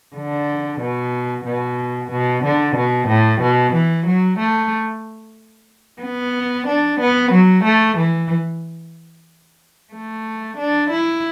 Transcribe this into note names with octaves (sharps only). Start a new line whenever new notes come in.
D3
B2
B2
B2
D3
B2
A2
B2
E3
F#3
A3
B3
D4
B3
F#3
A3
E3
A3
D4
E4